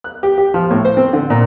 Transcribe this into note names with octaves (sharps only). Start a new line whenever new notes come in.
F#6
G4
G4
F3
A2
C5
C4
D3
A#2